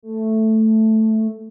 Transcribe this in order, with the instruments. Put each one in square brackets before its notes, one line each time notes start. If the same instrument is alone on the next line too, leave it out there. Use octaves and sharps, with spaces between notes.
[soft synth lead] A3